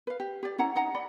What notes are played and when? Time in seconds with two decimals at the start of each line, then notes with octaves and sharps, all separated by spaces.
0.07 B4 F5
0.20 G4
0.43 G4 D5
0.58 C#4 E4 F#5 A#5
0.75 D#4 D#5 F#5 A#5
0.95 D5 F#5 B5